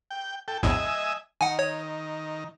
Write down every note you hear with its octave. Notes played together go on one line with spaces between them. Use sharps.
G5
A4 G5
A#1 E2 A2 D#5 E5 G#5
D#3 F#5 G#5
C#5